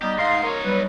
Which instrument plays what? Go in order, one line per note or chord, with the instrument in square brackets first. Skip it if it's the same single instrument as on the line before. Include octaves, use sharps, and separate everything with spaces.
[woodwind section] G3 B3 [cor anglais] D#4 [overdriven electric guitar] G4
[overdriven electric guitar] G#2 [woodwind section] F5 C6
[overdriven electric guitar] D#4 C#5 [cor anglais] A#4
[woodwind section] F#3 G3 [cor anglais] B4